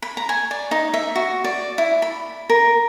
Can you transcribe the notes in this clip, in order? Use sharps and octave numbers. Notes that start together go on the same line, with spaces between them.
B5
A#5
G#5
D5
D#4
E5
F#4
D5
E4
B5
A#4